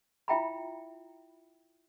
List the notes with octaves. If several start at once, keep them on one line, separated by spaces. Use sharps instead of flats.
E4 F4 E5 G5 A#5 B5